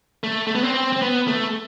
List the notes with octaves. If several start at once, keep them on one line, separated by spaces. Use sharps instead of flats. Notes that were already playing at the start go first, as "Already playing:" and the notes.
A3
A3
B3
C4
C4
B3
A3